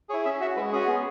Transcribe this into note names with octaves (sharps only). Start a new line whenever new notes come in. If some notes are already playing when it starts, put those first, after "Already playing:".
E4 G#4 C#5
C#4 E5
F#4 E5
G#3 B4
C#4 F#4 G#4
B3